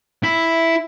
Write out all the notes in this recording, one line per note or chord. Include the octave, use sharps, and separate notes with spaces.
E4